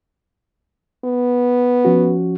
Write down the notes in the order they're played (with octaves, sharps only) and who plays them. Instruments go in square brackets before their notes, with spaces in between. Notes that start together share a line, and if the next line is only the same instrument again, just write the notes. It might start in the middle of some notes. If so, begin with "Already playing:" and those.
[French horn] B3
[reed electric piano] F3 C#4 F#4